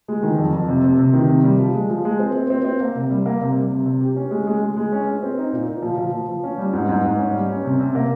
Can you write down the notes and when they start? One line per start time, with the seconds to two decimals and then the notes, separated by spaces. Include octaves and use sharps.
0.08 G#3
0.23 D#3
0.38 F2
0.53 F2
0.68 C3
0.84 C3
0.99 C3
1.13 D#3
1.29 C3
1.44 G3
1.59 F3
1.74 G#3
1.90 F3
2.05 G#3
2.19 C4
2.35 C4
2.50 C4
2.65 C4
2.80 A#3
2.95 C3
3.11 G3
3.26 A#3
3.41 C3
3.56 G3
3.71 C3
3.86 C3
4.01 G4
4.16 C#4
4.31 G#3
4.47 G#3
4.62 G#3
4.76 G#3
4.92 C#4
5.07 C#4
5.23 C4
5.37 D#4
5.53 A#2
5.68 A#2
5.82 F3
5.98 F3
6.13 F3
6.28 F3
6.43 C#4
6.58 G3
6.73 G#2
6.89 G#2
7.04 G#2
7.18 C#4
7.34 G3
7.49 C#4
7.65 C3
7.80 C3
7.95 A#3